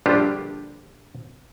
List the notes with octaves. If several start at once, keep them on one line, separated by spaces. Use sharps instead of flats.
A#1 G2 D3 D4 F4 G4